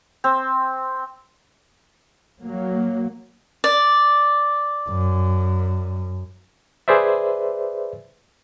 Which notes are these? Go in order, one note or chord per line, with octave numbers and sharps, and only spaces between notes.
C4
F#3 A#3
D5
F#2
G#4 B4 C5 D5 E5